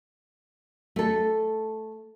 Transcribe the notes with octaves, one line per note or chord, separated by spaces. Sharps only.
A3 A4